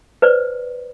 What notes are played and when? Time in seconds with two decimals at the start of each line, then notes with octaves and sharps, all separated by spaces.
0.22 B4 C5 D5